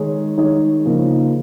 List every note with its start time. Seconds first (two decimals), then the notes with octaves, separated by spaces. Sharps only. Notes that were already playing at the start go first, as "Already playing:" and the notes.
Already playing: D#3 G#3 D#4 G#4 C#5
0.37 D#3 G#3 D#4 G#4 C#5
0.85 C#3 F3 A#3 D#4 A#4